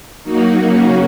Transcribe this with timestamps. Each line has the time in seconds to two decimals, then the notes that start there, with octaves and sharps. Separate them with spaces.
0.23 F#3 A#3 D#4 F#4
0.60 C#3 A#3 C#4 F#4